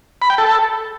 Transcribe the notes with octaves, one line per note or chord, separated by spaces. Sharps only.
B5
G5
A4